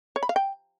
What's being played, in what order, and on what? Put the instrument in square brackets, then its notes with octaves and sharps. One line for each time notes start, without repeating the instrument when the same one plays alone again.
[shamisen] C#5
B5
F5
G5